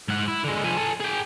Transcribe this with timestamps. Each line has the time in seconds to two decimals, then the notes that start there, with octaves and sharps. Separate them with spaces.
0.08 G#2 F#5
0.28 E4
0.44 D3 G#3
0.64 F3 G#5
0.77 A4 G#5
1.00 G#4 G5